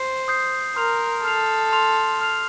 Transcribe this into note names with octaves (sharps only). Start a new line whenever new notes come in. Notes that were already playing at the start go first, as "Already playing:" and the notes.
Already playing: C5 C7
D#6 G6 C7
A#4 C6 F6 C7 F7
A4 C6 F6 C7 F7
C6 F6 C7 F7
C6 F6 C7 F7